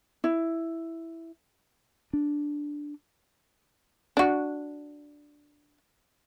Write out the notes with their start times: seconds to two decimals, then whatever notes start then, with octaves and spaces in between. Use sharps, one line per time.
0.24 E4
2.13 D4
4.17 D4 F#4